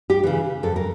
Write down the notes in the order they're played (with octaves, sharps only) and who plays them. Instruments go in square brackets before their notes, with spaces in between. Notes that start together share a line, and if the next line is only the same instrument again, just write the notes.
[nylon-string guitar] G4
C#3 E3
F2 A4
A#4